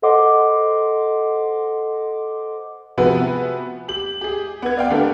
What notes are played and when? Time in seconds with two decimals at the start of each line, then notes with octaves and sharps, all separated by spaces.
0.02 A4 C5 D#5 F#5 C6 D6
2.98 C3 F3 B3 F#4 G#4 B4
3.88 G4 F#7
4.21 G4 G#4
4.62 B3 G#6
4.77 D5 F5 G5
4.90 D3 A3 B3 D4 G4 A#4